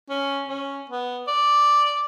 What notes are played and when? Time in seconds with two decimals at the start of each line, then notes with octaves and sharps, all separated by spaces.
0.10 C#4
0.48 C#4
0.90 B3
1.27 D5